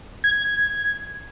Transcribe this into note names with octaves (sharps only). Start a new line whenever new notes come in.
G#6